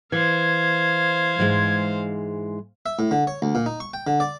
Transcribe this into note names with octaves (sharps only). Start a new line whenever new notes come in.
E3 C5 F5 G#6
G#2 E3 G#3
E5
A2
D3
C#5
D2
A#2
D#4
C#6
G5
D3
D5